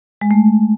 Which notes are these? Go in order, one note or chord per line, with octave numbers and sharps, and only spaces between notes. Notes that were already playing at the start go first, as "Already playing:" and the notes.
G#3
A3